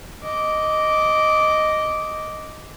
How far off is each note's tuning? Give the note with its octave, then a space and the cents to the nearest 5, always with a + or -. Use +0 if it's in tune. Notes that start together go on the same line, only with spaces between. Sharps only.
D#5 +0 D6 -10